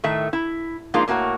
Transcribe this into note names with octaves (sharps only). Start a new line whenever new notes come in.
A2 D#3 A3 E5
E4
F3 G#3 A#3 D4 D#4 F4
A2 A#3 F#4 B4 C#5